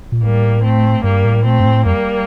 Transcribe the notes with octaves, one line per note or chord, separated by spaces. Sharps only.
A#2
A2 G3 A#3
A3 C4
G2 G3 A#3
A2
A#2 A3 C4
G2
A2
F2 G3 A#3